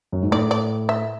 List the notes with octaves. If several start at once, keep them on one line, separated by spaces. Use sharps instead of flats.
F#2
G#2
A2 D5
D5
E5